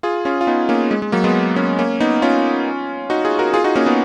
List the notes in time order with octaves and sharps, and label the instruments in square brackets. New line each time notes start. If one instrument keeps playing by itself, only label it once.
[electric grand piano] F4 G#4
C#4 F4
F4
B3 D#4
A#3 C#4
G#3
G#3
F#3 A#3
G#3 B3
A#3 C#4
A#3 C#4
B3 D#4
C#4 F4
D#4 F#4
F4 G#4
F#4 A#4
F4 G#4
D#4 F#4
A#3 C#4
B3 D#4